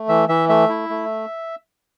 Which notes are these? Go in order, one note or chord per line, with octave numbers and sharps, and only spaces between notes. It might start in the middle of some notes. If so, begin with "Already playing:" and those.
Already playing: A3
E3 E5
E3 E5
A3 E5
E4
A3